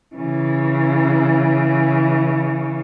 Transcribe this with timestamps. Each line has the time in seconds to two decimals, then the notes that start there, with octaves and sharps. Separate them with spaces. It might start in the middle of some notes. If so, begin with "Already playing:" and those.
0.15 C#3 E3